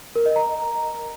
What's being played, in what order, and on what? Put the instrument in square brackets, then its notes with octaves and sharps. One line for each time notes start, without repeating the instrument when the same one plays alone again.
[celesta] A#4
D#5
A#5